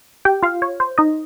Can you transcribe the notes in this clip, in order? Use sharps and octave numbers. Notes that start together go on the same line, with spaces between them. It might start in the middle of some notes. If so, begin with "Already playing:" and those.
G4 G5
F4 F5
C#5
C5
D#4 D#5